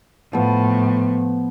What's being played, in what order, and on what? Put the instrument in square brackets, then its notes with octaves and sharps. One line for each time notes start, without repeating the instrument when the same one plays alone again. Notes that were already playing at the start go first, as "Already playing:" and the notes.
[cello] A2 [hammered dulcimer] F3 B3